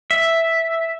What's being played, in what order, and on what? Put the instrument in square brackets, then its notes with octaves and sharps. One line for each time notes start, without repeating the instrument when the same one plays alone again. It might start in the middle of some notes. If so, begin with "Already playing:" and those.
[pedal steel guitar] E5